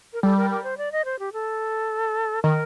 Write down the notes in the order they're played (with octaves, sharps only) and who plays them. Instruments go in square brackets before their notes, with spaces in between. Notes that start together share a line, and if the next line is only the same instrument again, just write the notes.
[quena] A#4
[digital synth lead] G3 [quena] A4
[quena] A#4
A#4
C5
D5
D#5
C5
G4
A4
[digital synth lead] D#3 [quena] A#4